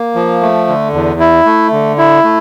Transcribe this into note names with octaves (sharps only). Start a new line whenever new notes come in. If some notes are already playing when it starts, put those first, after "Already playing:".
Already playing: A#3
F3
A3
D3
E2
E4
A3
D3
E4
A3